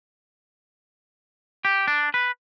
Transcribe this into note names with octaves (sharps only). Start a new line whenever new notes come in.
G4
D4
B4